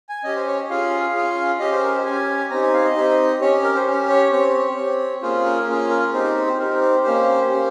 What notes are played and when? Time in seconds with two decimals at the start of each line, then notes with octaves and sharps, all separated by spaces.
0.09 G#5
0.24 C#4 G4 D#5
0.36 C5
0.47 C#5
0.70 C#4 F4 G#4 F5
1.14 C#4 F4 G#4
1.59 C#4 G4 D#5
1.72 C5
1.83 A#4
1.94 C5
2.05 C#4 G4 G#5
2.50 C4 D#4 G4 A#5
2.62 G#5
2.74 F5
2.84 D#5
2.96 C4 D#4 G4
3.41 C#4 G4 C#5
3.63 A#4
3.75 C5
3.87 C#4 G4
4.09 C#5
4.31 C4 G4 C#5
4.77 C4 G4
5.22 A#3 C#4 F4 G#4 C5
5.45 A#4
5.67 A#3 C#4 F4 G#4
5.90 A#4
6.13 C4 D#4 G4 C5
6.24 C5
6.47 C5
6.58 C4 D#4 G4 A#4
6.81 C5
7.03 A#3 C#4 G4 C5
7.48 A#3 C#4 G4